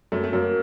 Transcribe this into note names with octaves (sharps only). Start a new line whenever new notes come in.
F#2 A3
A3
F#2 A#3